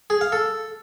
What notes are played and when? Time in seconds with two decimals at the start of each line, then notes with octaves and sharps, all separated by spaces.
0.10 G#4
0.21 F5
0.32 A4